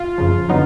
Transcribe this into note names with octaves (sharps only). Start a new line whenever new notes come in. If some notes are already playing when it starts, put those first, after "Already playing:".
Already playing: F4
F#2 C#3 F3
D3 F#3 B3 D#4